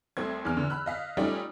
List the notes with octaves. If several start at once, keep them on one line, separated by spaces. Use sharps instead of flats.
C2 A3 C4 G#6
E2 E3 F6
D3 E3
B5 E6 F#6
D#5 F5 B6
G3 A3 C#4 D#4 F4 G4